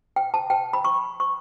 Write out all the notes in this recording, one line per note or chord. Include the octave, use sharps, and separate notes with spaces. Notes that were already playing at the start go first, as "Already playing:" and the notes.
G5
A5
G5
B5
C#6
C#6